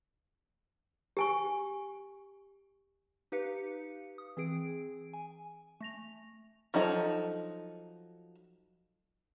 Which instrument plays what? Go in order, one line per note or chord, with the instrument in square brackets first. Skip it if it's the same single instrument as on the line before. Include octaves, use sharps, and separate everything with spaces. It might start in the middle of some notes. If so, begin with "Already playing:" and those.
[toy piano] G4 G#5 C#6
[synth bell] D#4 G4 B4 F5 C#7
D#6
E3 C4 G#4 D7
G#5
A3 A#6 F7
[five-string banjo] F3 F#3 D#4 A4